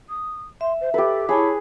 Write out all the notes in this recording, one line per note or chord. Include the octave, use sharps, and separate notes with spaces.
D#6
E5 C6
C5
G4 A4 B4
E4 G#4 C#5 A5 B5